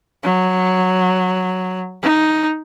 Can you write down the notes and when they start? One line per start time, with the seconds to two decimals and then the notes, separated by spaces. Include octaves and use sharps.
0.23 F#3
2.02 D#4